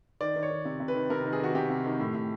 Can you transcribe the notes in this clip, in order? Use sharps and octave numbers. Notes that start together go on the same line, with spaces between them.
D#3 D5
D#3
C#5
D#3
C3
C3
B4
D#3
C3 A#4
D#3
G#4
D#3 F#4
C3 G4
C3
D#3
A2
A2